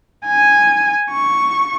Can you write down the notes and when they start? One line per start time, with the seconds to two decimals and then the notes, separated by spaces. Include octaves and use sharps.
0.27 G#5
1.12 C#6